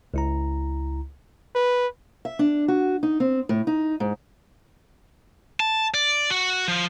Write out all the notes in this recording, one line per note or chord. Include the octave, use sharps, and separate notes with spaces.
C#2 E4 A#5
B4
E5
D4
F#4
D#4
C4
A2
D#4
G#2
A5
D5
F#4
F3